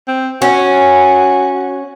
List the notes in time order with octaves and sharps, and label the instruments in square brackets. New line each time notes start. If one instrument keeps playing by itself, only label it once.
[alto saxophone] C4
[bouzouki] C#4 [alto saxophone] F#4